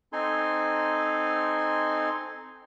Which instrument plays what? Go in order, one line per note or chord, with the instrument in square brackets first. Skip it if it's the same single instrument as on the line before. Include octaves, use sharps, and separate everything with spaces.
[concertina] C4 D#4 A4 G#5 C6